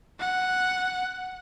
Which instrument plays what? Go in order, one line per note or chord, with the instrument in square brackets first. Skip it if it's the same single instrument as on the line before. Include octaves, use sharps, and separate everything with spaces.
[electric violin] F#5